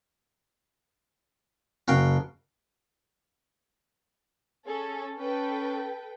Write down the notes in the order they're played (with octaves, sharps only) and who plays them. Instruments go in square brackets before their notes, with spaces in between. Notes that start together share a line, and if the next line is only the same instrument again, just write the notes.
[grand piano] F#1 [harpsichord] F#4 F5 G5
[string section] C#4 A4 [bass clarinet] G#4
[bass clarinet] C#4 [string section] A4 B4 G5